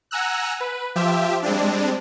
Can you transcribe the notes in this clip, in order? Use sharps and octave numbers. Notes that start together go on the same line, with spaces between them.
F#5 G#5 A#5 E6 F#6
B4
F3 F4 G4 E5
G3 G#3 C4 D4